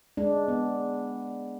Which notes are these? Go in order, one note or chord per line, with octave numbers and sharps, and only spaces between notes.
G#3 D4
B3